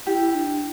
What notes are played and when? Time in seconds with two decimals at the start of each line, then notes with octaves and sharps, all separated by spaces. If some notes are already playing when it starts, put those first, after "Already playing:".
0.06 E4 G4
0.35 D4